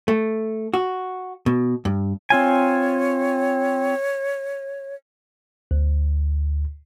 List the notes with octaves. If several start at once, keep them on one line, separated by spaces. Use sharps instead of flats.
A3
F#4
B2
G2
C4 F4 C#5 G#5
D2